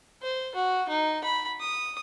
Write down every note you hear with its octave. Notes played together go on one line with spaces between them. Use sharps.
C5
F#4
D#4
B5
D#6